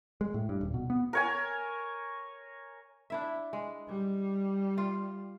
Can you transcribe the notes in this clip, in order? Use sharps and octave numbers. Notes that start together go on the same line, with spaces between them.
G#3
A2
G2
D#1
B2
B3
A#4 C#5 G#5
D4 E4 E5
G#3
G3
F4